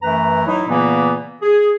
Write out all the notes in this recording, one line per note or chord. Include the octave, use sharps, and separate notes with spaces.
F#2 E3 A3 B4 A#5
F#3 D#4 E4
A#2 C#3 E3 A#3 B3
G#4